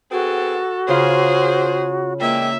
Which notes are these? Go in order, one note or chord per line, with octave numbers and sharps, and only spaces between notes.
B3 C4 F#4 G#4 A4
C#3 F4 G#4 A#4 C5
E2 A#2 G#3 A#3 E5 G5